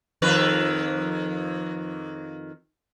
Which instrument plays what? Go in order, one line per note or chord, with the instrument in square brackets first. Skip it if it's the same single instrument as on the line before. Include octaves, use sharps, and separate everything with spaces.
[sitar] F2 D#3 B4